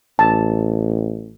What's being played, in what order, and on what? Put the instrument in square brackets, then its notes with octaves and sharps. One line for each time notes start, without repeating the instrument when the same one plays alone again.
[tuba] A1 [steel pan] A5